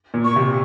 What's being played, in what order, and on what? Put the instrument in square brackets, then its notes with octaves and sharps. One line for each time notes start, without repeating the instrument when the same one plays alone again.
[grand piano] A#2
[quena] C#6
[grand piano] C3